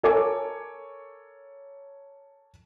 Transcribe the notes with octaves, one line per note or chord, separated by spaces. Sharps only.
A4 A#4 C#5 G#5 D6